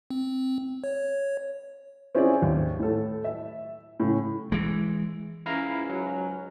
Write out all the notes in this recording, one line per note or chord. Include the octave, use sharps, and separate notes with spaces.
C4
C#5
C4 C#4 E4 F4 G#4 D5
D#2
A2 A4
E5
A2 C#3
E3 G#3
C#2 G#2 C#4 E4 F5 A#5
F#3